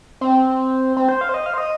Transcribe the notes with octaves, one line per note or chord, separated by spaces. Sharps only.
C4
C4
C5
F5
C5
D#5
F5
C5
D#5